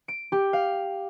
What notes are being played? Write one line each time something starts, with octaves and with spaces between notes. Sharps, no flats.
D7
G4
F5